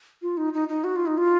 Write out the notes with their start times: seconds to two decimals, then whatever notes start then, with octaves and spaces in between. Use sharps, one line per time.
0.22 F4
0.37 D#4
0.54 D#4
0.69 D#4
0.84 F#4
0.96 F4
1.06 D#4
1.18 F4